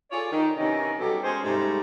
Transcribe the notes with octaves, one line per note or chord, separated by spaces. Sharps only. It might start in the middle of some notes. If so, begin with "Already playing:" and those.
F4 G#4 A4 C#5 D5
D#3
C3 D#3 E3 B3 C#4 D#4
B2 F#3 G3 G4 A4
G#3 C#4 G#4 C5
G#2 C3 G3 A3